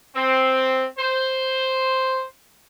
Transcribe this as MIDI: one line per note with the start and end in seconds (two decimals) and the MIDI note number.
0.15 0.84 60
0.98 2.24 72